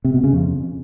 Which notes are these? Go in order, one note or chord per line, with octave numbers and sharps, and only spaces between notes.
C3
B2
C#3
F2